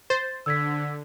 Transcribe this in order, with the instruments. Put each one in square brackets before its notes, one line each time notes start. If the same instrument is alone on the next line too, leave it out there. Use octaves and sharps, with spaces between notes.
[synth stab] C5 [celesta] A6
[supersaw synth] D3 [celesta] E6 G#6 B6